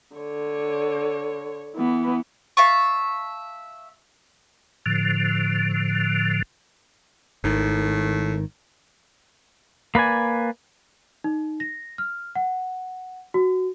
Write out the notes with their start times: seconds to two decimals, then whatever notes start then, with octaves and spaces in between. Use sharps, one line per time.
0.16 D3 C#5
1.76 E3 B3
2.57 E5 F5 A5 C#6
4.86 A2 D3 F3
7.44 G#1 A2 D#3
9.95 A#3 B4 D5 G#5
11.24 D#4
11.60 A#6
11.98 F6
12.35 F#5
13.34 F#4